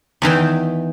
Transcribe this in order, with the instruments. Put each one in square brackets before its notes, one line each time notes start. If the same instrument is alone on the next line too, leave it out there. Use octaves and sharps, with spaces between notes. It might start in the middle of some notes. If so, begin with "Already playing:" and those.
[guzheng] E2 D#3 E3 G5